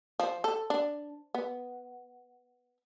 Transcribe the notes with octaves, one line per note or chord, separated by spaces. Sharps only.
F3
A4
D4
B3